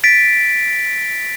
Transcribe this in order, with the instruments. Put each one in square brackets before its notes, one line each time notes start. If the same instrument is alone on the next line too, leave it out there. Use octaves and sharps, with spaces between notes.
[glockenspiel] A6 B6 D7